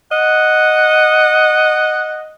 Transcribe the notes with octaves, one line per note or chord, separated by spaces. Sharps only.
D#5 F#5